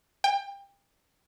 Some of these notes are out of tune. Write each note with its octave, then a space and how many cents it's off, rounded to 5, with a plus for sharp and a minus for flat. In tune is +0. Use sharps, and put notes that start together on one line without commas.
G5 +25